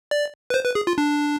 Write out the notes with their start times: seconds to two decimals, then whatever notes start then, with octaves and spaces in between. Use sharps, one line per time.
0.11 D5
0.50 B4
0.54 C5
0.65 B4
0.75 G#4
0.87 F4
0.98 D4